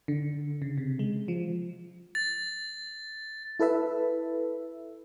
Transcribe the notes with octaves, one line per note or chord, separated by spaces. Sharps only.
D3
C#3
C3
G#3
F3
A6
E4 A4 B4 E5